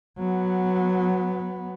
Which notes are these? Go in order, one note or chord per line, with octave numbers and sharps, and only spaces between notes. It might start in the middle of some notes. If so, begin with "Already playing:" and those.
F#3 B3